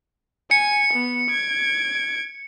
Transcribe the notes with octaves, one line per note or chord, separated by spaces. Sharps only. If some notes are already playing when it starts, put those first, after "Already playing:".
G#5 C#7
B3
G#6 D7